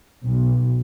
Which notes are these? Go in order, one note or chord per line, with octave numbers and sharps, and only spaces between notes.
B1